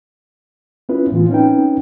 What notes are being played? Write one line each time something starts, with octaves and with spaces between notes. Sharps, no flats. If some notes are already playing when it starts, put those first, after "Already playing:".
B3 C#4 E4 F4 B4
A2 E3 B3 F4
C4 C#4 D#4 B4 G5